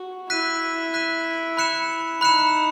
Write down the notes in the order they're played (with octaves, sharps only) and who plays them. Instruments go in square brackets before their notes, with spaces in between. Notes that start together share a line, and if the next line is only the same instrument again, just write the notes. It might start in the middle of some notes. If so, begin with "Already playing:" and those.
Already playing: [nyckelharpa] F#4
[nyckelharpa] E4 [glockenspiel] F#6 B6 D#7
[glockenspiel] F#6 B6 D#7
B5 F#6 C#7 E7
[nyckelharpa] D#4 [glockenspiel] B5 F#6 C#7 E7